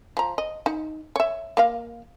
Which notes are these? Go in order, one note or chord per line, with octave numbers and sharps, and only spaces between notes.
F3 A#5
D#5
D#4
C#5 E5
A#3 D#5 F5